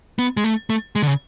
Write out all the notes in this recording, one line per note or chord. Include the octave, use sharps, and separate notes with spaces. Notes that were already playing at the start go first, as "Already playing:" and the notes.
B3
G#3
A3
A3
G#3
D3
C#3